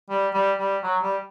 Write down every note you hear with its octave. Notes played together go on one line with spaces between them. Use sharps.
G3
G3
G3
F#3
G3